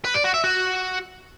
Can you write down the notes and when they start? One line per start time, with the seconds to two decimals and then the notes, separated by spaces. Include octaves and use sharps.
0.05 B4
0.14 D5
0.24 F#4
0.34 E5
0.44 F#4